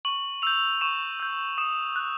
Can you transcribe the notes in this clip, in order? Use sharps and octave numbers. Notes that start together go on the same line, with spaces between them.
C#6 F#7
E6 G6 F7
C#6 E7
E6 G6
D#6 E7
F#6